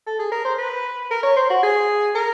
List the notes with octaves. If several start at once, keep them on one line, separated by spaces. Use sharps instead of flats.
A4
G#4
A#4
C5
B4
A#4
C#5
C5
F#4
G#4
A#4